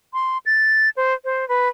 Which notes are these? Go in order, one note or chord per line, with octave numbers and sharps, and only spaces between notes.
C6
A6
C5
C5
B4